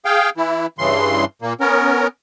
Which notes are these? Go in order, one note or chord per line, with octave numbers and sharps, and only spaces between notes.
G#4 F5 G5
E3 E4
G2 C#3 E3 C6
A#2 A#3
B3 C#4 A#4